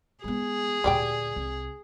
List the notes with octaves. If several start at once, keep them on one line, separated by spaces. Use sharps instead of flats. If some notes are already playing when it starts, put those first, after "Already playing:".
G#3 B3 G#4
D2 A#2 G3 D5 G5
C2